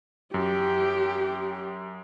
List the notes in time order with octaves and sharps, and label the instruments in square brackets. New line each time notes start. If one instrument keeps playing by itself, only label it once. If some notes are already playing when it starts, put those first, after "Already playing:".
[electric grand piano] F#2 [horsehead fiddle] G4